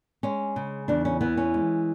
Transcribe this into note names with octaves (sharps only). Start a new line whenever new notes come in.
G#3 C#4
C#3
E2 D4
C#4
E3 B3
C#4
G#3